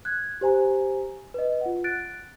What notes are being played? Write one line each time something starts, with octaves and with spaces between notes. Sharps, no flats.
F#6 G#6
G4 C5 G#5 A#5
B4 D#5
F4 F#5
F#6 A6 D7